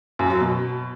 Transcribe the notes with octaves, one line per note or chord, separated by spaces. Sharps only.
F#2
F#3
B2